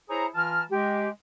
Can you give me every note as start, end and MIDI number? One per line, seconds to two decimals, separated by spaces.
0.09 0.26 64
0.09 0.26 68
0.09 0.26 72
0.09 0.26 73
0.09 0.26 82
0.35 0.62 52
0.35 0.62 65
0.35 0.62 81
0.35 0.62 82
0.35 0.62 89
0.70 1.08 56
0.70 1.08 67